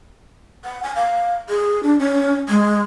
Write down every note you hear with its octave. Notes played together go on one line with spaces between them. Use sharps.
F#5
G#5
F5
G#4
D4
C#4
G#3